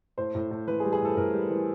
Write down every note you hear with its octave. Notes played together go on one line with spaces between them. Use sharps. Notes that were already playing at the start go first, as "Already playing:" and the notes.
A2 C5
A2
A2
E3 B4
G#4
G3
G#4
A2 A4
A2 A#4
G3
E3